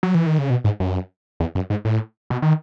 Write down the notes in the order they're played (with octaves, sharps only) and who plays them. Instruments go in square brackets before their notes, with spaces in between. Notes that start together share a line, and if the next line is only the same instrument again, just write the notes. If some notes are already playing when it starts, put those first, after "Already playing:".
[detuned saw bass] F#3
E3
D#3
C#3
B2
G#2
F#2
E2
F#2
G#2
A2
B2
D#3